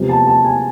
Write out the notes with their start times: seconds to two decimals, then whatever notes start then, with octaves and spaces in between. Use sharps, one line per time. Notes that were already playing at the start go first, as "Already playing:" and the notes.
Already playing: C3 F3 G#3 B3
0.09 A5
0.27 A5
0.45 G#5